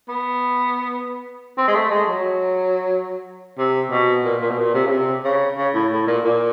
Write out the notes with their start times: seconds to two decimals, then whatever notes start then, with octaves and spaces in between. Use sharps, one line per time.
0.08 B3
1.58 C4
1.68 G#3
1.75 A3
1.91 G#3
2.08 F#3
3.58 C3
3.91 B2
4.24 A#2
4.41 A#2
4.50 B2
4.58 A#2
4.74 C3
4.86 C#3
4.91 C3
5.25 C#3
5.57 C#3
5.74 A2
5.92 A2
6.07 A#2
6.25 A#2